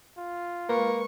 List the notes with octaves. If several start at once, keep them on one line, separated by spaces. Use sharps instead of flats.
F4
G#3 A#3 A#4 B4 C#6